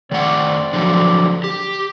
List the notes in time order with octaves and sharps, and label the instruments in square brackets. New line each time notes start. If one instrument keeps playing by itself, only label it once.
[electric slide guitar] D#3 A3 F#5 [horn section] C4 D5
[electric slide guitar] D3 F3 F#3
G4